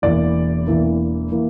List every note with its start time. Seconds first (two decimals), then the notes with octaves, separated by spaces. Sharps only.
0.02 E1 E2 E3 A#3 D5
0.67 E1 E2 E3 A#3
1.32 E3 A#3